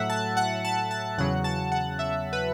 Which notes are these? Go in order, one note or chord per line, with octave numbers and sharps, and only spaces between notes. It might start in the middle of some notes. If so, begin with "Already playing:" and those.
Already playing: A2 F#3 E5 F#5
A5
F#5
A5
A5
E2 C#3 F#3 F#5
A5
F#5
E5
B4